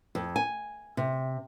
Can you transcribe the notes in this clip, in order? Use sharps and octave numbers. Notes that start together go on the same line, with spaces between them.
F2
G#5
C3